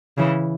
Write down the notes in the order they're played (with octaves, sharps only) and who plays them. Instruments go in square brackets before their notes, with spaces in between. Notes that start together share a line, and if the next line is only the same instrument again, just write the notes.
[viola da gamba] C#3 E3